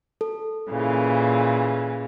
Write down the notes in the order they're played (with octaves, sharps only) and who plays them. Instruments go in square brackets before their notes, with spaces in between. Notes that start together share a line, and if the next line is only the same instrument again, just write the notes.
[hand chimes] A4
[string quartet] A#2 C#3 E3